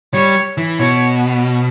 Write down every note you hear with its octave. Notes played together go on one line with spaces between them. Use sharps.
G3 C#5
E3
B2 C#5